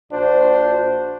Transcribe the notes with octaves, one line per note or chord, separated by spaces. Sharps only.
A#1 D4 F#4 C5